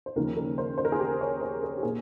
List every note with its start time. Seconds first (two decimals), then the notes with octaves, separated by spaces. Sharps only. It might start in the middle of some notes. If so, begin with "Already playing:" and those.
0.06 C5
0.16 D#2 C#3 F3 A#4
0.37 A#4
0.58 C5
0.78 C5
0.85 A#4
0.92 G#4
0.99 G4
1.21 C#5
1.41 C5
1.63 A#4
1.77 G4
1.83 A#2 G#4